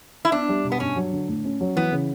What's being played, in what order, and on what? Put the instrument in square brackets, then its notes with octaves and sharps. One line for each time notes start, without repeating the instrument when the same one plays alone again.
[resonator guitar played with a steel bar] E4
[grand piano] B3 [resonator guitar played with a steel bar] D4
[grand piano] G3
B2
[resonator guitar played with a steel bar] B3
[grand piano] G2 [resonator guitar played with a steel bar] C#4
[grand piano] F#3
D3
A2
C#4
F#3
[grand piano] E3 [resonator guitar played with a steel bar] B3
[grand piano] C#3